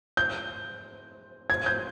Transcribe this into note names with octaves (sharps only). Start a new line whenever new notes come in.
G6
G#6
G6